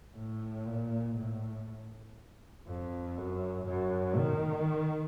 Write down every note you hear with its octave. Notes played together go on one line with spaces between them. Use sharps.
A2
A#2
A2
F2
F#2
F#2
D#3